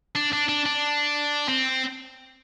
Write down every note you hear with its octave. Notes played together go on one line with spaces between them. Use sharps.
D4
D4
D4
D4
C4